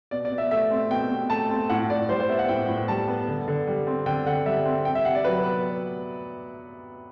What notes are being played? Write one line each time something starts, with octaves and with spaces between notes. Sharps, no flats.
B2 D5
D5
B2
E5
A3 E5
C4
B2 G5
B2
A3 A5
C4
A2 F#5
A2 D5
G3 C5
C5
B3 E5
F#5
A2 G5
A2
G3 A5
B3
D3
D3
G3
C4
D3 G5
D3 F#5
G3 E5
C4
C3 G5
E5
C3 F#5
D5
F#3 B4
B3